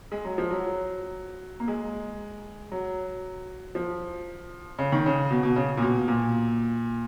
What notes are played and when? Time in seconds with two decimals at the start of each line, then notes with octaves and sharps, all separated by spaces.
0.12 G#3
0.25 F#3
0.38 F3
0.51 F#3
1.60 A#3
1.68 G#3
2.72 F#3
3.75 F3
4.78 C#3
4.92 D#3
5.06 C#3
5.31 B2
5.43 B2
5.56 C#3
5.77 A#2
5.82 B2
6.08 A#2